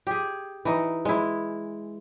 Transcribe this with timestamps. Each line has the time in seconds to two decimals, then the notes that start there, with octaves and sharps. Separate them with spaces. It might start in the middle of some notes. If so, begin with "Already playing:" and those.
0.07 G4 G#4
0.65 E3 D#4
1.05 G#3 E4